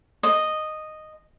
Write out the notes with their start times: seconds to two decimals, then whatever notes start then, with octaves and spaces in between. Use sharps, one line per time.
0.23 D#5